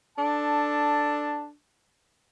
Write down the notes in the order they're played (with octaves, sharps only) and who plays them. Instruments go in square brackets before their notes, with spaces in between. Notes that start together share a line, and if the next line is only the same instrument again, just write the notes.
[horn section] D4 A4 A5